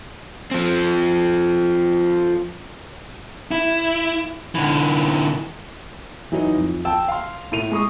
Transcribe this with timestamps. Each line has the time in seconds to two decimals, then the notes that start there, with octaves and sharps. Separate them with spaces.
0.51 F3 C4
3.51 E4
4.55 D3 E3
6.32 E3 F#3 D#4
6.57 F2
6.85 G5 A5 E6
7.08 F5 C6
7.52 A2 A3 D#7 F7
7.71 G#3 C#6 D#6